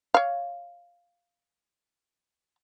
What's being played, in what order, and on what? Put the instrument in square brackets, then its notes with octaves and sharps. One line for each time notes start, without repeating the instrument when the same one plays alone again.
[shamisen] C#5 F5